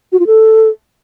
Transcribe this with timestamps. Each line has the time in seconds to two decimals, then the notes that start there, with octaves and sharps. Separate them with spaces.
0.12 F#4
0.19 F4
0.27 A4